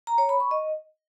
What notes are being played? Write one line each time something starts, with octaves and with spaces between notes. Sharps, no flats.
A#5
C#5
B5
C#6
D#5